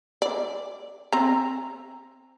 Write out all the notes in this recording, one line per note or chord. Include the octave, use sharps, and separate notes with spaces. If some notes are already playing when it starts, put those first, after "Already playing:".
D5
C4 A#5